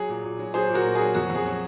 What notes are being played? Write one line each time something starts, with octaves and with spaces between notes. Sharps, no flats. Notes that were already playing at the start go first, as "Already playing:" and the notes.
Already playing: F#3 G#4
A#2
A#2
F#3
F#3 G#4 C5
A#2
F#4 A#4
A#2
G#4
F#3
F2 F#4
F2
G#4
F#3